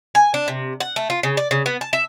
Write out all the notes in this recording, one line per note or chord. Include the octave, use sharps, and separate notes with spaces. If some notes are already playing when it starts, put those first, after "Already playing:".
G#5
D4
C3
F#5
A3
F4
C#3
D5
C#3
B3
A5
E5